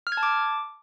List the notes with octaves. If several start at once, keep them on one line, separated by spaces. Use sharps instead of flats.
F6
G#6
A5
D6